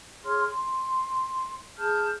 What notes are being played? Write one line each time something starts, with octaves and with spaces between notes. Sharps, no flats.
G#4 C#5 C6 F6
C6
G#4 A5 F6 G6